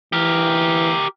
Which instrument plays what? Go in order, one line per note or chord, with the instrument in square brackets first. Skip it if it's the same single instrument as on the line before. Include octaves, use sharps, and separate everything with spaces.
[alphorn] E3 [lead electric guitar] G4 A#4